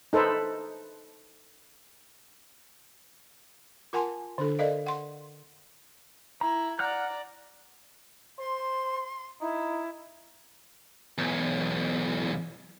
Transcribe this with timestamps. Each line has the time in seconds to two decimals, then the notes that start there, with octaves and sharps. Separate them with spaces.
0.13 D#4 A4 B4 C5 E5
3.93 F4 A#4 F#5 G#5 A5 C6
4.38 D3 D4 A4
4.59 A4 A#4 D5 D#5 F5
4.86 F#5 C6
6.41 E4 A#5
6.79 D5 F#5 A#5 F6 F#6
8.39 C5 C6
9.41 D#4 E4
11.18 B1 E2